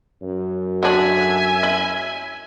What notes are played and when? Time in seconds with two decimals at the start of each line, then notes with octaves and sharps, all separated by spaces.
0.22 F#2
0.83 D3 F#3 D4 E5 G#5
1.63 E4